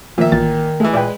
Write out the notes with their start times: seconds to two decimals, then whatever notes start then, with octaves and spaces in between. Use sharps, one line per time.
0.18 A#2 D#3 F3 E5
0.32 A1 A#2 E3 A6
0.80 E3 G#3 A3 E5
0.93 A#2 G#3 B4 D5 E5 G5